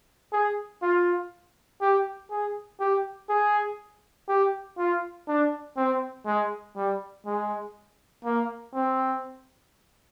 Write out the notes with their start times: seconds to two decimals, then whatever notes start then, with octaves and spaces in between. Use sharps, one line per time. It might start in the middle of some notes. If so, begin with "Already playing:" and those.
0.33 G#4
0.82 F4
1.81 G4
2.31 G#4
2.80 G4
3.29 G#4
4.28 G4
4.78 F4
5.28 D4
5.77 C4
6.26 G#3
6.76 G3
7.26 G#3
8.25 A#3
8.75 C4